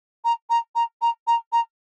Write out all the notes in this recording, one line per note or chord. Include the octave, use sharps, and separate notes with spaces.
A#5
A#5
A#5
A#5
A#5
A#5